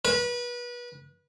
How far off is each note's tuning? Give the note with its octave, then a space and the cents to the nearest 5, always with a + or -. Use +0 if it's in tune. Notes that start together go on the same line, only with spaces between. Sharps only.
B4 -30